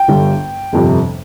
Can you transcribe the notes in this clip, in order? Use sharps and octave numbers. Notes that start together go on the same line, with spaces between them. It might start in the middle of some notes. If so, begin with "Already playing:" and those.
Already playing: G5
G1 G2 D3 G3
G1 F2 C3